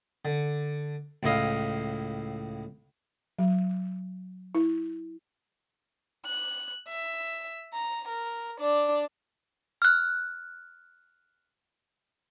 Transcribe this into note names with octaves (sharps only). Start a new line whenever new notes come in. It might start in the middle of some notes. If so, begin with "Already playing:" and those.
D3
C#2 A2 E4 D#5 F5
F#3
E4
F#6
E5
A#5
A#4
D4 D5
F6 F#6